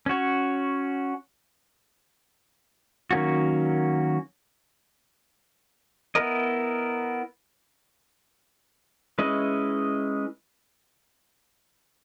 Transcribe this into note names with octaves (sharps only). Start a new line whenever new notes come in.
C#4 F#4 C#5
D#3 F#3 A#3 C#4 F#4
B3 E4 A#4 D#5
G#3 C#4 E4 B4 D#5